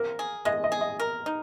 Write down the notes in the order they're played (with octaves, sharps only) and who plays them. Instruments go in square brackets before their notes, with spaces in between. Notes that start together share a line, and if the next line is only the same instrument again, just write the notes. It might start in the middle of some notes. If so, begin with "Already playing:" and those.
Already playing: [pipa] A#3 C4 [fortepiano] A#4
[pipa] G#4
[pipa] G#3 [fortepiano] D#5
[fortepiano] D#5
[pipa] G#4
[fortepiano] D#5
[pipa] A#4
D#4